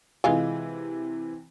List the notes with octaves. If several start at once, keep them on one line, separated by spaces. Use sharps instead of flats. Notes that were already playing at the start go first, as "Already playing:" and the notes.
C3 E3 G#3 F4 G#5